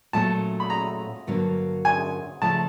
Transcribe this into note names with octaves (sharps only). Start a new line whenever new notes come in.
A#2 F#3 A3 C#4 A5
B5
A#5
G2 D3 F#3 A#3
G#5
C#3 F3 A3 A5